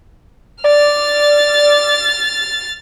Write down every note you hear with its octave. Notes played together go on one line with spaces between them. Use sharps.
D5 F6 A6